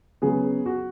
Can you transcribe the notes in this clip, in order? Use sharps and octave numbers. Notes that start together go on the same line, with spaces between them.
C#3 F#3 B3 G#4
F#4